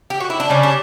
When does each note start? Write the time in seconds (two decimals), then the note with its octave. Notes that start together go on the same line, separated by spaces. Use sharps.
0.10 G4
0.20 F#4
0.30 E4
0.40 D4
0.50 C#3 G3 C#4
0.63 D4